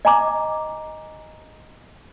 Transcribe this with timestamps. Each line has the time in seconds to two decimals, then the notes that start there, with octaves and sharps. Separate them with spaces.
0.05 D#5 G#5 A#5 D6